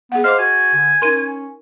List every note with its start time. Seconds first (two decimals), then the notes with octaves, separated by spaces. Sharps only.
0.12 B3 G#4 F#5
0.24 C5 D#5 F5 D6 F6
0.39 F#4 G#5
0.74 D3
1.02 C#4 D#4 A#4 C6 D#7